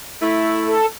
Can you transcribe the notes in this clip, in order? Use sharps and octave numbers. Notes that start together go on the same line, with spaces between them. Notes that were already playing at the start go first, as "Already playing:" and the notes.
A3 E4
A4